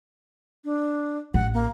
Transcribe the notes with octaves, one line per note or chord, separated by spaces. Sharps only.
D4
A1 F#5
A#3